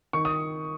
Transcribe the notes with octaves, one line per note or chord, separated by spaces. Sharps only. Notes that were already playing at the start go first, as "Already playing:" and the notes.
D#3 C#6
D#6